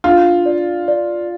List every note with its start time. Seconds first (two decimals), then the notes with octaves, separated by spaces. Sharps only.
0.04 D4 F4
0.46 D5
0.88 D5